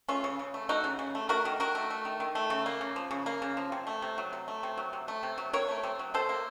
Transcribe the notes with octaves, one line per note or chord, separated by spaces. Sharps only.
A3 C#4 F4
C#3
C#3
A3
A3 D#4 F#4
C#3
C#3
A3
A3 F#4 A#4
D#3
D#3 F#4 A#4
A3
A3
D#3
D#3
A3
C#3
A#3
C#3
F3
C#3
A#3
C#3
F3
C3
A3
C3
F#3
C3
A3
C3
F#3
C3
A3
C3
F#3
C3 A#4 C#5
A3
C3
F#3
C3 A4 C5
A#3